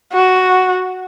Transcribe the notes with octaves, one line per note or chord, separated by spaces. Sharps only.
F#4